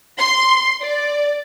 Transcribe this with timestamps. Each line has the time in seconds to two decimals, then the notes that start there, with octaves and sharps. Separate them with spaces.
0.18 C6
0.81 D5